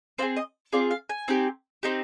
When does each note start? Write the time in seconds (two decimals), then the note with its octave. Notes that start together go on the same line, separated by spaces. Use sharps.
0.18 C4 F4 C5
0.22 G#4
0.36 D#5
0.72 C4 F4 G#4 D5
0.91 F5
1.09 G#5
1.28 C4 D#4 G4
1.83 C4 D#4 G4